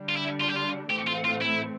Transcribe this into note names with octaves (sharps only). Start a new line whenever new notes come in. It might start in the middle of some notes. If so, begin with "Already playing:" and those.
Already playing: D3 G3 D4
F4
E4
F4
G4
F4
A2 E3 A3 C4 G4
F4
F4
E4